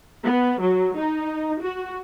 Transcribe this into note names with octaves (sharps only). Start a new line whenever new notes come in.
B3
F#3
D#4
F#4